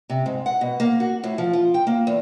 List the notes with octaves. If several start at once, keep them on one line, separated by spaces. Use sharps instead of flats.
C3
G#2
F#5
B2
A#3
F#4
A2
F3
F4
G5
A#3
E2